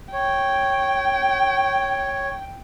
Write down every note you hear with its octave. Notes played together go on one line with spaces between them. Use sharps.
C#5 G5